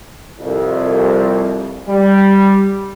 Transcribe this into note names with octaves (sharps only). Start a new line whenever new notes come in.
C2 F2
G3